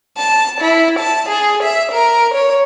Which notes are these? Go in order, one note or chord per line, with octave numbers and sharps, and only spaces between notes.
A5
E4
A5
G#4
E5
A#4
C#5